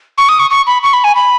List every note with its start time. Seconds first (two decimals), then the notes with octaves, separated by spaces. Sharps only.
0.18 C#6
0.29 D#6
0.39 C#6
0.50 C#6
0.67 B5
0.83 C#6
0.93 B5
1.04 G#5
1.15 B5